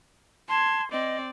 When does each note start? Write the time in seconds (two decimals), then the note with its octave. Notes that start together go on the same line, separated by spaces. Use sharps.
0.49 A5 C6 G#6
0.92 C4 D5 D#5